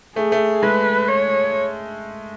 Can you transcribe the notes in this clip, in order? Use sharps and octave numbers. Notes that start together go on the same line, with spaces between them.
A3 G#4
A3
G#3 B4
C#5